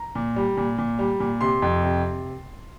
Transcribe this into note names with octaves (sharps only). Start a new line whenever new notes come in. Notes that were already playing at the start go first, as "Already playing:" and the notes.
Already playing: A#5
A#2
G3
A#2
A#2
G3
A#2
C3 C6
F2
C3